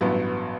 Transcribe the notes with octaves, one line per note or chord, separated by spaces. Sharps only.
A1 G2 F#3 B3